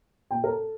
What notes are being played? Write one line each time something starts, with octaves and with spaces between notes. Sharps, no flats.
A#2 G5
A#4
A4